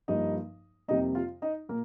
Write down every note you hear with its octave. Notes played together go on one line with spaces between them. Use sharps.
G2 F3 A#3 D#4 D#5
F2 C3 G3 A#3 D#4 D#5
F4 F5
D#4 D#5
A#2 A#3 A#4